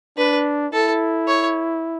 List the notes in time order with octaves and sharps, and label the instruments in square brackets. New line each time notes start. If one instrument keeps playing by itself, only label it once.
[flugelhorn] D4 [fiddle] B4
[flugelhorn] E4 [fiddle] A4
[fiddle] C#5